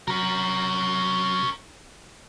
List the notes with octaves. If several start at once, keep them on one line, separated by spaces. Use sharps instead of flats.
C3 F#3 C#4 A#4